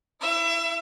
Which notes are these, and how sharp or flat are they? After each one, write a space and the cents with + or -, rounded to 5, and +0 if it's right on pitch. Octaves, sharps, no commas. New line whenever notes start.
E4 +0 E5 +35